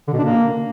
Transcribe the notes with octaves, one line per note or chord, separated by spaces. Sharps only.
D3
B2
D4
A#3